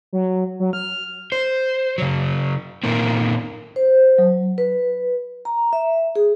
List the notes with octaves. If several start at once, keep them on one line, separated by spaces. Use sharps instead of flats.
F#3
F#3
F6
C5
C#3 F#3
A#2 D#3 A#3 C4
C5
F#3
B4
A#5
E5
G#4